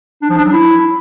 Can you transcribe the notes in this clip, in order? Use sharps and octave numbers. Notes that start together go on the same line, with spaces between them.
D4
F3
D4
F#3
E4